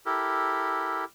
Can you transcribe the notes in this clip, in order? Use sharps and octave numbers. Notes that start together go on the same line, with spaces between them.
E4 G4 A4 A#4